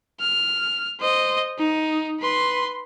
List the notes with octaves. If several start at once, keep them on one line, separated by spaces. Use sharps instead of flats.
F6
C5 D#5
D#4
B4 C6